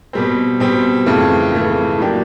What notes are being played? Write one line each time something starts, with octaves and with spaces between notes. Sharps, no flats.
B2 G3 C4
B2 G3 C4
F2 C#3 E3 A3
F2 C#3 E3 A3
A2 F#3 A#3 D4 G4